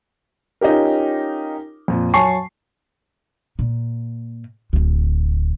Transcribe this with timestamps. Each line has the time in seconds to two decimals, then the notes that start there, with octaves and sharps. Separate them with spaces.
0.61 C#4 D#4 F4 G4 A#4
1.88 F2 A#2
2.14 F#3 G#5 A5 C#6 C7
3.59 A#2
4.73 D1 D2